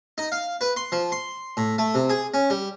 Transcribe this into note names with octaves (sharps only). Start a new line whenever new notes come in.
D#4
F5
B4
C6
F3
C6
A2
A3
C3
G#4
C#4
G3